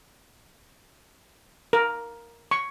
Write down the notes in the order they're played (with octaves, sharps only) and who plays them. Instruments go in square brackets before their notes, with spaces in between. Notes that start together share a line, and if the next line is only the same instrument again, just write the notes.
[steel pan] A#4
C#6